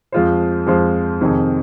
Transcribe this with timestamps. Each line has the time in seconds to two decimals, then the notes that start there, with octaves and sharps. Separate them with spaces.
0.12 F2 F3 G#3 F4 C5
0.66 F2 F3 G#3 F4 C5
1.21 F2 C3 D#3 C4 G#4